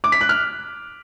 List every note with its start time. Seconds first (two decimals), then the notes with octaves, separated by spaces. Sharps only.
0.04 D6
0.12 B6
0.21 F#6
0.29 F6